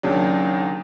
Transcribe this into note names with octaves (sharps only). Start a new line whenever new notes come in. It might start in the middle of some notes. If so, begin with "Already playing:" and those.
D#2 C#3 F#3 D4